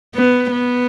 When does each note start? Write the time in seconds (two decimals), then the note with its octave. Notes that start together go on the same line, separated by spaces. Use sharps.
0.15 B3
0.52 B3